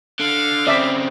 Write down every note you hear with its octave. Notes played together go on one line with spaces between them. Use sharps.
D3 F5
C#3 C4 D5 E5